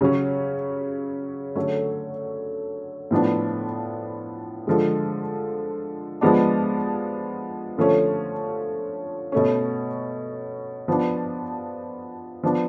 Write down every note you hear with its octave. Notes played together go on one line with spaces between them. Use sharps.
C#3 F#3 C#4
D3 F#3 A3 C#4
A2 F3 B3 D4
D3 F3 G#3
F3 G#3 B3 D4
D3 F3 A3 C#4
B2 A3 C#4
F3 B3 D4
F3 B3 D4